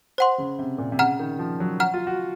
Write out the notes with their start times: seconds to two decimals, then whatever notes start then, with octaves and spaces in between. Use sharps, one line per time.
0.18 C5 F#5 C6
0.38 C#3
0.59 C3
0.78 A#2
0.92 C3
0.99 C#3 F#5 A#5 F6
1.19 D#3
1.39 F3
1.60 F#3
1.80 F#5 A#5 F6
1.94 F4
2.07 F#4